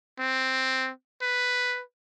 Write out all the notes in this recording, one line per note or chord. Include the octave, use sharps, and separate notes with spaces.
C4
B4